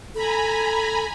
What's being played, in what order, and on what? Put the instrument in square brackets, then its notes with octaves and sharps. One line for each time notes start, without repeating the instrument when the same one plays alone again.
[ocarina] A4 [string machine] G#5 A#5 B5